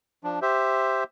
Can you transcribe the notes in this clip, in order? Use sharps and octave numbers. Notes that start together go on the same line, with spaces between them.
F3 D4
G4 C5 E5